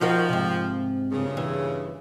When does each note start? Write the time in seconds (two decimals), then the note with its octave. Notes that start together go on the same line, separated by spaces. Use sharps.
0.01 F3 D#4 F#4 A#4
0.29 G#2 C3
1.12 G2 A#2 C#3
1.37 E3